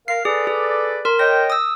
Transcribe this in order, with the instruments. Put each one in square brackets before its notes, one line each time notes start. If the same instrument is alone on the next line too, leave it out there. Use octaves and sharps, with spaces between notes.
[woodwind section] A#4 F5 [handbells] C7
[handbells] G#4 [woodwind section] A4 B4 D5
[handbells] G#4
A#4 C6
[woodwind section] C#5 D#5 G5 [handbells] A#6
[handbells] D#6 E6